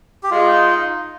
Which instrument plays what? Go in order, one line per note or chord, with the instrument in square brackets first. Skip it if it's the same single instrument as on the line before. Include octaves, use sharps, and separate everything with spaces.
[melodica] G4
[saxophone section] G#3 [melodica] F4
[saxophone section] D#4